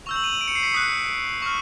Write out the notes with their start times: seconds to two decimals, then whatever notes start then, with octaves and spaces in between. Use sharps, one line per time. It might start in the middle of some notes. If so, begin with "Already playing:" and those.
0.06 C#6 E6 G6 F7
0.16 F#7
0.24 D#7 F7
0.41 D7
0.48 C#7
0.55 C7
0.63 B6 C#7
0.74 D#6 F#6 B6
1.42 C#6 F6